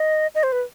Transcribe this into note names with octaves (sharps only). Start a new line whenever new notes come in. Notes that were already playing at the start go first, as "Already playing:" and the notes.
Already playing: D#5
D#5
C5
B4